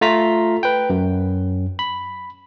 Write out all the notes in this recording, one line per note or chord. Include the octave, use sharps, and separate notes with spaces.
A3 F4 A#5 B6
B4 G5
F#2
B5